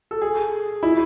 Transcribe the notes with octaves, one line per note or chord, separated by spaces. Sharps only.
A4
G#4
E4